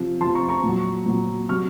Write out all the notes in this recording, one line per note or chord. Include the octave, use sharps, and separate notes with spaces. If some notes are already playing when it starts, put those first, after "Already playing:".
Already playing: C3 F3
C3 F3 A5 C6
A#5 C#6
A#5 C#6
A#2 F#3
A#2 F#3
C3 F#3 C#6 F6